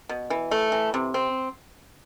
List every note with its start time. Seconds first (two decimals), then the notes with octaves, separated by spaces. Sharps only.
0.09 B2
0.30 E3
0.51 A3
0.72 E3
0.94 C3
1.14 C4